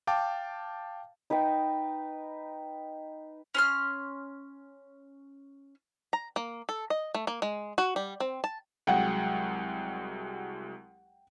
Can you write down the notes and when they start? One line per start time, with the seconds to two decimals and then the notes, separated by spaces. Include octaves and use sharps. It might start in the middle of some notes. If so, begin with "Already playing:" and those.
0.07 F5 G5 A5 D6
1.30 D#4 B4 D#5 G5
3.55 C#4 C6 F6
6.13 A#5
6.36 A#3
6.69 A4
6.90 D#5
7.15 A3
7.27 A#3
7.42 G#3
7.78 F#4
7.96 G3
8.20 C4
8.44 A5
8.87 C2 F#3 G#3 F#5 G5